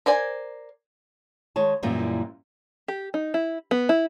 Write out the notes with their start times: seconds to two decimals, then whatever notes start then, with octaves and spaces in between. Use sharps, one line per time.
0.06 A#4 C5 D5 G#5
1.56 D#3 G#3 C#5 A5
1.83 F#2 A#2 E3 G3 A#3
2.88 G4
3.14 D#4
3.34 E4
3.71 B3
3.89 E4